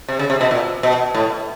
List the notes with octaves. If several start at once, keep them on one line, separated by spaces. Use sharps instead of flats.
C3
C#3
C3
B2
A#2
B2
A2